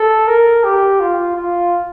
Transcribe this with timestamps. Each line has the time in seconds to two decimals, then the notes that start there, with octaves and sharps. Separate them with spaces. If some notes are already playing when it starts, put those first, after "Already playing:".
Already playing: A4
0.27 A#4
0.64 G4
1.00 F4
1.36 F4